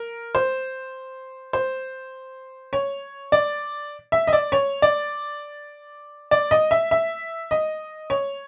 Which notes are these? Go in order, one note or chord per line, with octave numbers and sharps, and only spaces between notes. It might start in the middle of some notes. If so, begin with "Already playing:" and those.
Already playing: A#4
C5
C5
C#5
D5
E5
D#5
D5
C#5
D5
D5
D#5
E5
E5
D#5
C#5